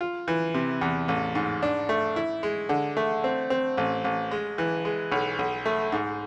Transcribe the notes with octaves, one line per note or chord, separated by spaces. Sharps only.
F4
E3
C3
E2
A1
G#2
D4
A3
E4
G#3
D3
A3
C4
C4
A1
A1
G#3
E3
G#3
B1
B1
A3
G#2